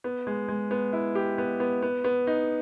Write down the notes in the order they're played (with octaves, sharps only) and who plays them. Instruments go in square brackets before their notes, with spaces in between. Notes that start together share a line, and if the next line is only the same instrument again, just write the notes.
[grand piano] B3
G#3
G#3
B3
E4
G4
B3
B3
B3
B3
D#4